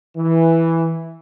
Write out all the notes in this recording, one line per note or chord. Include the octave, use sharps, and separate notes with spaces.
E3